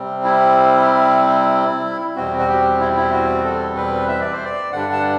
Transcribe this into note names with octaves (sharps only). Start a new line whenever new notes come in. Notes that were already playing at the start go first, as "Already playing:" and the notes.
Already playing: C3 G3 C4
E4
E2 B2 G3 C4 F#4
F#4
G4
E4
E4
F#4
A4
B4
E5
D5
C5
D5
G2 D3 G3 D4 F#5
A5